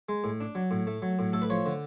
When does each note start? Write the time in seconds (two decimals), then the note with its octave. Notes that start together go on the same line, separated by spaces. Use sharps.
0.09 G#3
0.24 A2
0.41 D4
0.55 F#3
0.71 A2
0.87 A3
1.02 F#3
1.19 A2
1.33 A3 A4
1.42 B4
1.50 F3 C#5
1.66 D3